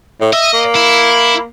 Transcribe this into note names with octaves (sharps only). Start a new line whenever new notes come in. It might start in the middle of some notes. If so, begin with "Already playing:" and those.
A2
D#5 E5
A#3
E4